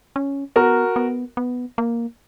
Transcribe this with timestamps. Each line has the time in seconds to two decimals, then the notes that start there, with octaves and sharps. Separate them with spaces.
0.16 C#4
0.56 B3 F#4 A#4
0.96 B3
1.37 B3
1.78 A#3